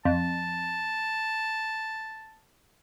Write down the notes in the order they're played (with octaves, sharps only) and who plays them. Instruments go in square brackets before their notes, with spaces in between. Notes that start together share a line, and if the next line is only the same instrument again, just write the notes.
[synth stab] F2 [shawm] A5